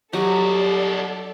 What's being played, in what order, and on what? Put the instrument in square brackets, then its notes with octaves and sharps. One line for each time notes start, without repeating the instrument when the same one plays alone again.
[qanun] F#3 [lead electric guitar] D#4 F#4 [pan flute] G4 [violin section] A4 D5